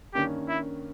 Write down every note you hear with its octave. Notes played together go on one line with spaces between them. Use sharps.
G2 D#3 A#3 C#4 G4
E4